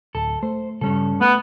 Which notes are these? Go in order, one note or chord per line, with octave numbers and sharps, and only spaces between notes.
D1 A4
A3 C5
G2 C#3 G3 C#4 A4
A3 B3